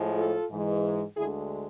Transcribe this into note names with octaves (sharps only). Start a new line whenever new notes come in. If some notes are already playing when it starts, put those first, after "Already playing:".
Already playing: A2 F3 G#3
F4 A4
G#2 E3 G#3
D2 D3 G#3 E4 G#4